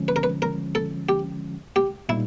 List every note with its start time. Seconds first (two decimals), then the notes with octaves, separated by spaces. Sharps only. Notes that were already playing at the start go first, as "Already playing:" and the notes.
Already playing: D3 F3 G#3 C#4
0.08 B4
0.16 A#4
0.23 B4
0.42 A#4
0.75 A4
1.09 G4
1.76 G4
2.09 A#2 G3 A#3 D#4 E4